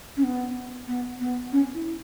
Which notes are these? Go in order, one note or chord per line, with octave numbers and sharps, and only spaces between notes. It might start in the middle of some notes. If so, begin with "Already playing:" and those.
C#4
B3
B3
B3
C#4
E4